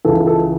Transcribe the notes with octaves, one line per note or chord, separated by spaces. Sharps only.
C#2 C#3 E3 A4
A4